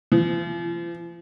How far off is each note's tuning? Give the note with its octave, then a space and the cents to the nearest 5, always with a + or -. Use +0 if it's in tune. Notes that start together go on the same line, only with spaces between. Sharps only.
F3 -45